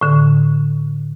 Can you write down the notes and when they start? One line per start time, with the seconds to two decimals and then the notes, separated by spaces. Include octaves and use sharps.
0.01 A2 D3